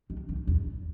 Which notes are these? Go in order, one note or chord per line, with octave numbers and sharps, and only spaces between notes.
D#3
D#3
E2